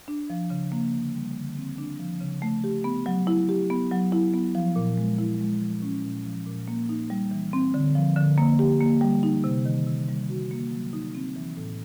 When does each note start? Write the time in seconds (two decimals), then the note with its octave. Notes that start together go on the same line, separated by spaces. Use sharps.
0.08 D4
0.30 F3
0.50 C#3
0.72 A#3
0.93 D3
1.15 G3
1.36 D3
1.57 C4
1.78 D4
1.99 F3
2.20 C#3
2.42 A3
2.64 G4
2.84 B3
3.06 F#3
3.27 E4
3.49 G4
3.70 B3
3.91 F#3
4.12 E4
4.34 B3
4.55 F3
4.76 A#2
4.98 G#3
5.18 E4
5.40 G#3
5.61 F3
5.82 C#4
6.04 A#2
6.25 F3
6.46 A#2
6.68 A#3
6.89 D#4
7.10 G3
7.31 E3
7.53 C4
7.74 D3
7.95 F3
8.16 D3
8.38 A#3
8.59 G4
8.80 A#3
9.01 G3
9.23 D#4
9.44 C3
9.65 D#3
9.87 C3
10.08 G3
10.29 F#4
10.51 A#3
10.72 F#3
10.93 D#4
11.15 C4
11.36 E3
11.57 A2